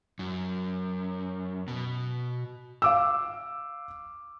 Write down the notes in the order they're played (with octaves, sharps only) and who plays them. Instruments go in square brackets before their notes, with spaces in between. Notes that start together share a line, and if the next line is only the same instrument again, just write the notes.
[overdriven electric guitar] F#2
B2
[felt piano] F5 D6 E6